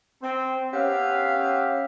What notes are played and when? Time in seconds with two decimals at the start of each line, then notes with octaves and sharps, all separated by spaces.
0.22 C4
0.73 B3 C#4 G4 E5 F5